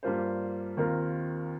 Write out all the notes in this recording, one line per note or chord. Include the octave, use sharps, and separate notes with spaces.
G2 G3 A#3 F4 C5
D#2 D#3 C4 F4 A#4